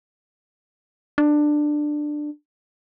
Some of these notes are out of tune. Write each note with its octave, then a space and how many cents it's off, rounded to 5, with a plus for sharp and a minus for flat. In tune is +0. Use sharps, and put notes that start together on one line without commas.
D4 +15